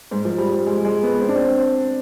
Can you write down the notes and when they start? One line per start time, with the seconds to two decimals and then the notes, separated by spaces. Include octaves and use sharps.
0.11 G#2
0.25 F3
0.38 G3
0.52 G3
0.66 G#3
0.85 G#3
1.03 B3
1.21 C4
1.29 D4
1.35 C4
1.49 C4